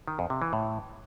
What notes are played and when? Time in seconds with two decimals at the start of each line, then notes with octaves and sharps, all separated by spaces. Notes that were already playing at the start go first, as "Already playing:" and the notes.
0.08 D#3
0.19 F2
0.30 C3
0.42 E3
0.53 A2